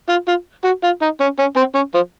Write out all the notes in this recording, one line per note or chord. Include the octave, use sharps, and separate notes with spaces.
F4
F4
F#4
F4
D#4
C#4
C#4
C4
C#4
F3